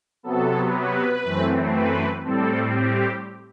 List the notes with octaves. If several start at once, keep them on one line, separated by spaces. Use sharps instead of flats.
C3 F#3 B3 A4
B4
F#2 E3 A3 C4
B4
A2 G3 C4 A4
G4